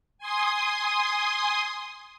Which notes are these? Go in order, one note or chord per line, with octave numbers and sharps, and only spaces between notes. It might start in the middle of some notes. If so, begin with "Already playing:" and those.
G#5 C6 D#6